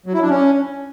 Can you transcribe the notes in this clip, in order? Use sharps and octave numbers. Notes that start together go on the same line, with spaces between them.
F#3
E4
D4
C#4